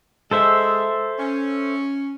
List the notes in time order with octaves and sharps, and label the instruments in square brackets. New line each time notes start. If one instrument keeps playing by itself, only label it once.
[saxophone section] G#3 [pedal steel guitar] A4 C5 E5
[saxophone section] C#4